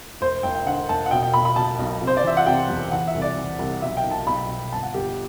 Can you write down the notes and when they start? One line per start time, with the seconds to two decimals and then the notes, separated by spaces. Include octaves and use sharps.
0.21 E1 C5
0.43 E1 G5
0.55 G5
0.66 D3 F#5
0.89 E1 A5
1.06 F#5
1.11 B2 G5
1.23 G5
1.34 B2 B5
1.45 B5
1.56 B2 A5
1.79 B1
2.02 C3
2.07 C5
2.17 D5
2.24 E3 E5
2.37 F#5
2.46 C3 G5
2.68 E2
2.92 E3 F#5
3.07 E5
3.15 C2
3.22 D5
3.37 E3
3.59 C2
3.82 B1 E5
3.97 G5
4.04 B1
4.11 A5
4.26 B1 B5
4.49 B2
4.72 G1 A5
4.83 F#5
4.94 G1 G4